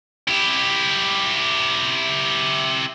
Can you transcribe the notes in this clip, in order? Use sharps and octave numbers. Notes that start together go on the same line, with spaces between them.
E4 G4